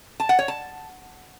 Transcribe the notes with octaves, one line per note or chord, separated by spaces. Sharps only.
A5
F#5
C#5
A5